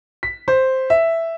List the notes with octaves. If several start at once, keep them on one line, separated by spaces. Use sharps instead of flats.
B6
C5
E5